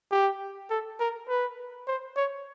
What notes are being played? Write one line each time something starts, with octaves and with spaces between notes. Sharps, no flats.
G4
A4
A#4
B4
C5
C#5